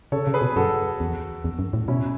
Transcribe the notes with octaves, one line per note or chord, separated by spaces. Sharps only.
C#3 A4 C#5
C#3
G#4 B4
B2
F#2 F#4 A4
E2
E2
F#2
A2
B2 C#4 E4